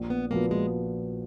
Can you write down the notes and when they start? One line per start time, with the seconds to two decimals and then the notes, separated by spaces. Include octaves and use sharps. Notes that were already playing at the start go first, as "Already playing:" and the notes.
Already playing: A#1
0.10 B3
0.31 A#2 F3 A#3 B3 F#4
0.51 G#3